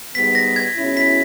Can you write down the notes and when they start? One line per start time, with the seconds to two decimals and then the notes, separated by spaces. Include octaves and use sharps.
0.14 G#2 G3 B3 B6
0.35 A#6
0.56 G#6
0.77 B2 G#3 C#4 E4
0.97 B6